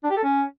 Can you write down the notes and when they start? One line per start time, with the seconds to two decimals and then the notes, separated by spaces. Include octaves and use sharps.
0.04 D4
0.10 G4
0.17 A4
0.23 C#4